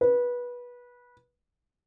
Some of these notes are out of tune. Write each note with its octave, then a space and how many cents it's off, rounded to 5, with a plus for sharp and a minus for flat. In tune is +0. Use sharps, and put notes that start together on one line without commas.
B4 -20